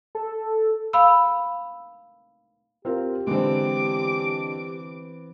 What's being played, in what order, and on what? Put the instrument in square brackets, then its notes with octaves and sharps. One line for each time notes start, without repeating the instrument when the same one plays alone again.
[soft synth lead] A4
[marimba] F5 B5 E6
[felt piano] C4 F4 A#4 [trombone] G4
[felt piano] D3 G#3 [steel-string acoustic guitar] E3 B3 C4 [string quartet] D6